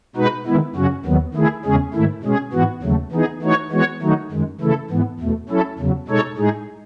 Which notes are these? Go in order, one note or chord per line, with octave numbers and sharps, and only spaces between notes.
B2 G#3 D#4 F#4 B4
D#3 G#3 B3 E4
F#2 C#3 F#3 C#4 F#4
D#2 D#3 F#3 B3
D#3 A3 E4 G#4
E2 C#3 G#3 C#4 G#4
G#2 D#3 A3 E4
B2 G#3 C#4 G#4
G#2 E3 B3 F#4
D#2 C#3 F#3 A3
E3 B3 D#4 G#4
E3 A3 D#4 F#4 C#5
E3 G#3 B3 F#4 C#5
D#3 F#3 A3 D#4 F#4
F#2 D#3 G#3
C#3 E3 A3 E4 A4
G#2 E3 B3
E2 B2 A3
F#3 C#4 E4 A4
E2 C#3 F#3
B2 G#3 D#4 A4 C#5
A2 G#3 D#4 G#4